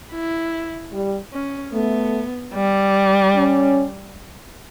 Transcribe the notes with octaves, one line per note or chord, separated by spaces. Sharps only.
E4
G3
C#4
A3 B3
G3
C#4